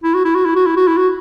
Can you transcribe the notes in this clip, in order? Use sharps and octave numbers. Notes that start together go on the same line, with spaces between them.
E4
F#4
E4
F#4
E4
F#4
E4
F#4
E4
F#4